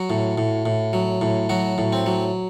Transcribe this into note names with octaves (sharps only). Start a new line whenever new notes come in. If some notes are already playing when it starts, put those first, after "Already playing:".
Already playing: F#3 F#4
A2
A2
A2
F#3
A2
F#3 F#4
A2
C4
F#3